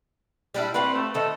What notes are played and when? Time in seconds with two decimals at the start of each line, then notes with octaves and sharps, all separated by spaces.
0.54 G3 D4 E4
0.74 C4 F#4 B4 F5
0.94 A3
1.14 C3 D#3 D#4 A4